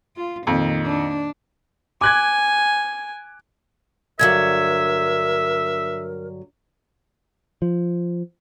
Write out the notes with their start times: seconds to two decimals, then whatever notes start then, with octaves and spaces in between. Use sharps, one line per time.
0.16 F4
0.47 F2 A#2 D#3
0.85 D4
2.01 G#5 D6 F#6 G#6
4.19 G2 D3 F#3 A#4 E5 G#6
7.62 F3